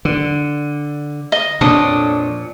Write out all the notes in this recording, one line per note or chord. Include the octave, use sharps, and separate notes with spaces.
D3
D#5
F2 A#2 D4 A4 C#5 D#6